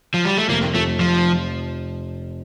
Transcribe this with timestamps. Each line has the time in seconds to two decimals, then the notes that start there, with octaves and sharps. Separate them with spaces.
0.14 F3
0.25 G3
0.38 A3
0.49 F1 A#3
0.74 F1 A3
1.00 F3